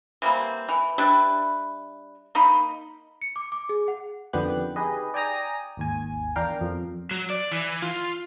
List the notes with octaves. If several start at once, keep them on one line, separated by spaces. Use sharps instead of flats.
E3 G3 A#3 C4
E3
G3 D4 E4 B4
A#3 D#4 B5
C#7
D6
D6
G#4
F#5
F2 D3 D#3 B3 G4 F#6
D#4 G4 G#4 B4 D#5
D5 G5 G#5 A#5 D#6 A#6
G#1 D#2 G#5
E2 D4 A#4 F5 G5
F2
F#3
D5
E3
F4